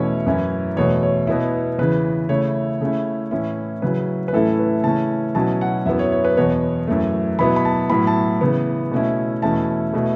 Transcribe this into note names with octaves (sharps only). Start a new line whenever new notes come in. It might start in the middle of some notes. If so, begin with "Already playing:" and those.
Already playing: E2 B2 A3 C#4 E4 C#5
F#2 E3 C#4 E4
E2 B2 A3 C#5
C#5
B2 B3 E4
E2 C#3 E3 B4
C#3 A3 E4 C#5
C#3 A3 C#4 E4
A2 E3 C#4 E4
C#3 F#3 C#4 E4 B4
B4
A2 E3 A3 C#4 E4 A4
B4
C#3 E3 A3 C#4 A5
B2 F#3 C#4 E4 A5
F#5
F#2 F#3 B3 E4 E5
C#5
C#5
B4
E2 B2 B3 C#5
F#2 E3 A3
B2 F#3 B3 E4 B5
B5
A5
A2 F#3 B3 E4 B5
A5
C#3 E3 B3
B2 A3 C#4 E4
E2 B2 A3 C#4 E4 A5
B2 A3 E4